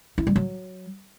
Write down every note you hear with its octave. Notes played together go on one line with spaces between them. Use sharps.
E4
G3
F#3